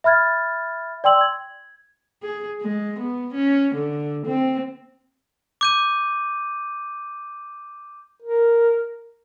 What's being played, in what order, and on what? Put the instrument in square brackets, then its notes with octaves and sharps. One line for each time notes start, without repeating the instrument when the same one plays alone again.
[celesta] E5 B5 F6 G#6 A6
D5 G5 C6 E6 F#7
G#6
[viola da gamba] G#4
G#3
B3
C#4
D3
C4
[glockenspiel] D6 G6 D#7
[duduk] A#4